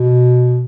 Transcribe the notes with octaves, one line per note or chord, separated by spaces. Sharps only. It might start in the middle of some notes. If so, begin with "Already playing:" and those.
Already playing: B2